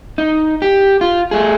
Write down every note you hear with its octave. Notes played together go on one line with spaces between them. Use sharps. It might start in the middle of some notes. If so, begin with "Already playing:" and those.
D#4
G4
F4
A3 G#4